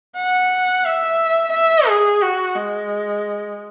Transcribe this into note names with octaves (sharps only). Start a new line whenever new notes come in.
F#5
E5
E5
G#4
F#4
G#3